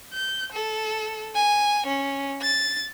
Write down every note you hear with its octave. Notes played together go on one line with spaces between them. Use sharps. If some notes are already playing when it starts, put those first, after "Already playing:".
G6
A4
G#5
C#4
A6